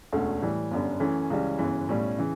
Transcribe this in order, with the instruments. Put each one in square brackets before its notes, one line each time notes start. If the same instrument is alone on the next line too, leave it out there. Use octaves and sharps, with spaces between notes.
[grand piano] E1 D2 D3 A3 C#4
A2 E3 G3
G1 F#2 D3 G3
F#2 E3 A3 C#4
C#2 C#3 E3 G3 C#4
G1 F#2 C#3 E3
B1 A2 G3 C#4
C#3 E3